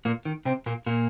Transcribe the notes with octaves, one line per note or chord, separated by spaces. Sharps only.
A#2 A#3
D#3
C3 C4
A#2 A#3
A#2 A#3